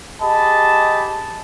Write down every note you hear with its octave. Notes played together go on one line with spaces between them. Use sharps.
G4 G#4 D#5 A5 B5